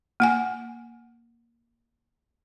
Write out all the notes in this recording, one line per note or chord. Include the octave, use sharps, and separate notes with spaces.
A#3 F#5 G#5